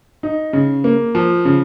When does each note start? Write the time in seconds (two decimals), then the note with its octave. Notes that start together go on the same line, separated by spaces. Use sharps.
0.23 D#4
0.53 C#3
0.84 A#3
1.15 F3
1.45 C#3